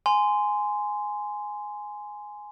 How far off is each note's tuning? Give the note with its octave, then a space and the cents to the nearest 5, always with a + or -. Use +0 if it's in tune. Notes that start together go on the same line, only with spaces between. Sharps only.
G#5 +5 C6 -15